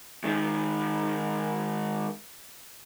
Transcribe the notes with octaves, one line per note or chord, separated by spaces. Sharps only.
G#2 D#3